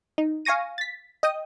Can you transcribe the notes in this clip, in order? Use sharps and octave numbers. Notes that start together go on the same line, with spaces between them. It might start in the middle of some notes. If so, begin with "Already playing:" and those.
D#4
F5 G#5 C#6 A#6 D#7
A6 B6
D#5 G5 D#6